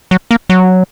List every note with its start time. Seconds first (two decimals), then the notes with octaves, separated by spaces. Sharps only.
0.11 F#3
0.31 A#3
0.50 F#3